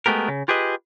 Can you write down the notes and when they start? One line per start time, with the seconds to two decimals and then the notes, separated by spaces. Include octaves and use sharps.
0.06 G#3 A3 B3 G4 A#4
0.28 C#3
0.48 F4 G4 G#4 B4 D#5